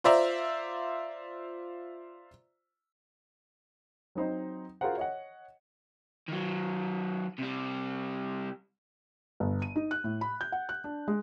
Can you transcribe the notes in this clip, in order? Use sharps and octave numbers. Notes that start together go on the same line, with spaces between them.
F4 C5 D5 E5 A#5 C6
F#3 C4 D#4 C5
F4 F#4 G#4 A#4 C5 F#5
C#5 D#5 F#5
D#3 F#3
C3 G3
G1
D#7
D#4
F#6
A2
B5
G6
F#5
F#6
D4
G#3